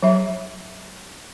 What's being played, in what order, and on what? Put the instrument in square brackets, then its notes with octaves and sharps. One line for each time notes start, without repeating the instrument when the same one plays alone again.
[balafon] F#3 E5